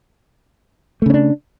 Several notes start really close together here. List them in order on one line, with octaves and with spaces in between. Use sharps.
A3 C#3 C#4 D4